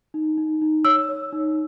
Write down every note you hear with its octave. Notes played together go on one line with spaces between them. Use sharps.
D#4
D#4
D#4
C#5 E6
C#5
D#4